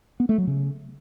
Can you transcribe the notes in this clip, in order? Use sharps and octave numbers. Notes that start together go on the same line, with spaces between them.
B3
A3
F#3
C#3